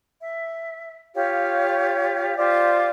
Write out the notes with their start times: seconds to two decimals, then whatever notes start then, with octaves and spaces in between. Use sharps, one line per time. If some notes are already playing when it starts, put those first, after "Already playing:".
0.19 E5
1.14 F4 G4 C#5 F5
2.37 F4 G4 C5 D5